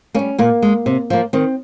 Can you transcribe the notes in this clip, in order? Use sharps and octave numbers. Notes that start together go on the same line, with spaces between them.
G3 A#3 C#4
A#2 A#3
G#3
C3
F3 A#3
D#3 C4